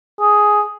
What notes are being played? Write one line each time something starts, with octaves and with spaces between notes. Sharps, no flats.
G#4